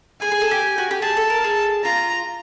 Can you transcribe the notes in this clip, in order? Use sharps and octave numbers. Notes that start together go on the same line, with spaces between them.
G#4 G#5
G#4
A4
G4
F#4
G4
G#4 A5
A4
A#4
G#4
F4 A#5